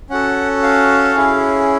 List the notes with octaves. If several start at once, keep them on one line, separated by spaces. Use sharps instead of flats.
C#4 F#4 A4 F#5
F5
C#4 E4 G#4